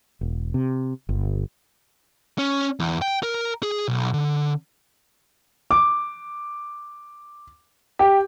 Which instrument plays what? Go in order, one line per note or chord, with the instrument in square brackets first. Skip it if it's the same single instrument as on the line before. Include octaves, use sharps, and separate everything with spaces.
[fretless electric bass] E1
C3
G1
[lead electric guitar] C#4
E2
G5
A#4
G#4
B1
D3
[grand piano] D6
G4